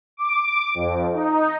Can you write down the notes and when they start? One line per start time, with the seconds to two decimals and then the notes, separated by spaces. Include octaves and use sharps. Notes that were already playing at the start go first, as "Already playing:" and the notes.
0.17 D6
0.75 F2
1.13 D#4